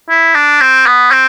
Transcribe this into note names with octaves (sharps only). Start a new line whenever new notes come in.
E4
D4
C4
B3
C4